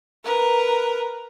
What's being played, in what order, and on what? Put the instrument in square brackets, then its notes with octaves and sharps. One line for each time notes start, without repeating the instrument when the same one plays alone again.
[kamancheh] A#4 B4